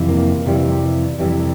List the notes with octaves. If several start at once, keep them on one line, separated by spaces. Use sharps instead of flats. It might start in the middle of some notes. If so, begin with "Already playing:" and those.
Already playing: F2 C3 E3
A#3
F2 C3 E3 G3
F2 C3 E3 G3